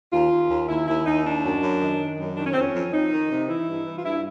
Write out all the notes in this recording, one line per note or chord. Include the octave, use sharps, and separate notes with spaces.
D#2 F4
D#2
D#2
D#2 E4
D#2 E4
D#2 D#4
D#3 D4
F#2
F#2
D#3
D#3
F#2
D#3 D4
C#4
F2 C4
C#4
F2
F2 D#4
D#3
C3
E3 E4
G2
E3
F4
G2 E4